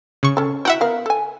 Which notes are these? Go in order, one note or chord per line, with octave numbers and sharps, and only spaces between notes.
C#3 C#6
C#4 A4
E4 F#4 E5 F#5 G5
B3 A#4 F5
A4 G#5